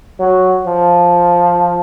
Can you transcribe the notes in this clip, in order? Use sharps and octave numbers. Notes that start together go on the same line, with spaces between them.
F#3
F3